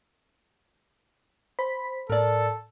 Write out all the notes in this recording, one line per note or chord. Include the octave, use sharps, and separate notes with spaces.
C5 B5 B6
A2 A4 A#4 D5